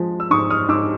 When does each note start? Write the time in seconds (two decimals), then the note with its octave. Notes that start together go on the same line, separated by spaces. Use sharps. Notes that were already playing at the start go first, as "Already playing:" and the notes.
Already playing: F3 G#3
0.20 E6
0.30 G#2 C#6 D#6
0.50 D#6 F6
0.68 G#2 D6 E6